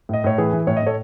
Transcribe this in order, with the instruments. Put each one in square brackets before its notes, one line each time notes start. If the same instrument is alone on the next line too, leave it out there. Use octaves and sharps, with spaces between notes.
[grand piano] A2 D#5
A2 C#5
E3 G#4 B4
E3
A2 C#5
D#5
A2 A4 C#5